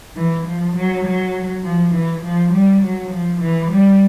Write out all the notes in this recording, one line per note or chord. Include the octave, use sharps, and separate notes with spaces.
E3
F3
F#3
F#3
F3
E3
F3
G3
F#3
F3
E3
G3